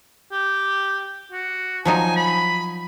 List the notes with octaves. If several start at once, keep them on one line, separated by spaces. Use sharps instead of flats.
G4
F#4
F3 F#3 D#4 G#5
B5